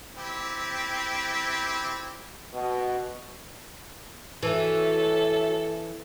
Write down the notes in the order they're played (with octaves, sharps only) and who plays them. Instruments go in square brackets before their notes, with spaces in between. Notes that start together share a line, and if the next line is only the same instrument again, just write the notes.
[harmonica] C4 E4 G4
[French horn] B2
[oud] E3 [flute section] F#4 C#5 E5 [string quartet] A4